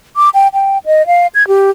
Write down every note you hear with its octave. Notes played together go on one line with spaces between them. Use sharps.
D6
G5
G5
D#5
F5
G#6
G4